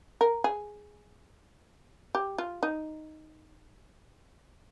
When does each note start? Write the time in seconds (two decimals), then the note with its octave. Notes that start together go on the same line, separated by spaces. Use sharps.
0.21 A#4
0.44 G#4
2.15 G4
2.38 F4
2.63 D#4